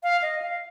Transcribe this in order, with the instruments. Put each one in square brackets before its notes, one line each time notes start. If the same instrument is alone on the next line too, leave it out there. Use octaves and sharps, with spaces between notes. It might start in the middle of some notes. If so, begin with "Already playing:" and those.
[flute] F5
D#5
F5